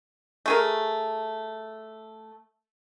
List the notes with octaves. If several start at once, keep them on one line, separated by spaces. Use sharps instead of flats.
A3 G#4 A#4